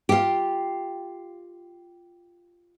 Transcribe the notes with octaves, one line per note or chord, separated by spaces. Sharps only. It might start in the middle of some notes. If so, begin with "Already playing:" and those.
F4 G4